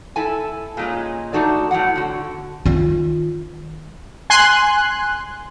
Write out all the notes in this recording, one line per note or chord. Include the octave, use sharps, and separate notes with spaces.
E4 A4 G#5
A#2 G#3 C#4
A3 D4 D#4 F#4 A4 D5
A2 F#3 G3 F#5
D3 F#4
D#3 F4
G#5 C6 F#6